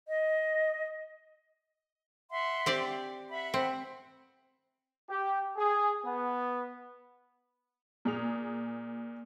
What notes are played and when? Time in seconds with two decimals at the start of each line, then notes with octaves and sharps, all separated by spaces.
0.08 D#5
2.31 E5 F#5 C6
2.66 C4 G4 D5
3.30 E5 F#5 B5
3.54 C4
5.09 G4
5.56 G#4
6.05 B3
8.05 A#2 G#4 F7